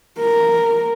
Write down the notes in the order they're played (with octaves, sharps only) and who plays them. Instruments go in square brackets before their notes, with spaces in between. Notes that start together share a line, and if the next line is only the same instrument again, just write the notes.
[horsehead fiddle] A#4